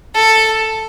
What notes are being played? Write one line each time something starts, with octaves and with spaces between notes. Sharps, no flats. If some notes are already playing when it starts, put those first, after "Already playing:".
A4